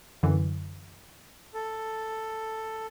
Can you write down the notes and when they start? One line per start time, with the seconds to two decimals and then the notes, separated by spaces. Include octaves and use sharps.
0.23 F#2 D3 E3
1.54 A4